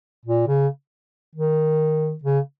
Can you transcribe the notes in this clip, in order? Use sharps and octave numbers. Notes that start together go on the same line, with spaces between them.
A#2
C#3
D#3
C#3